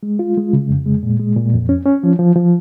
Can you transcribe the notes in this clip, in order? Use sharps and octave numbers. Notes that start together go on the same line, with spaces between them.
G#3
F4
G#3
C#3
F2
G#3
A#2
G#3
A#2
F2
C#4
C#4
F3
F3
F3